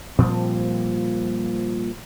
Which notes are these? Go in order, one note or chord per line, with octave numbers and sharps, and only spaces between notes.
A#2 F3 G3 C4